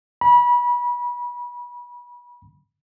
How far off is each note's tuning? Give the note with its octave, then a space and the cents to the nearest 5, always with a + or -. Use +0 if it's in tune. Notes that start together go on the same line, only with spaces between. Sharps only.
B5 -30